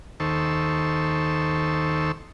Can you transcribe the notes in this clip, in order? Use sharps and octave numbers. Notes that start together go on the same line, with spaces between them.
D#2 D#3 A4 C5 C#6 E6